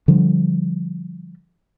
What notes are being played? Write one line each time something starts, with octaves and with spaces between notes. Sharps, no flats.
D3 F3 G3